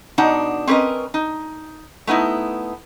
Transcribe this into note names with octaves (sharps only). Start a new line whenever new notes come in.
B2 D4 D#4 F#5
C4 C#4 A#4 B4 D#5
D#4
A3 B3 D#4 E4